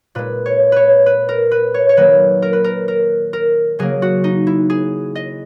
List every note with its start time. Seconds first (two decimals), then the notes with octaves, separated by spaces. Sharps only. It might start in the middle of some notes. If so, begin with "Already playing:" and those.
0.15 A#2 G#3 B4
0.46 C#5
0.72 B4 C#5
1.06 B4
1.29 A#4
1.51 B4
1.74 C#5
1.89 C#5
1.97 D#3 F#3 A#3 B4
2.42 A#4
2.53 B4
2.64 A#4
2.88 A#4
3.33 A#4
3.79 C#3 F#3 A#3 G#4
4.02 F#4
4.24 D#4
4.47 E4
4.70 G#4
5.15 D#5